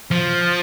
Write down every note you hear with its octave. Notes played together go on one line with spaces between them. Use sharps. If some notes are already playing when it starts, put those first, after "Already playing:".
F3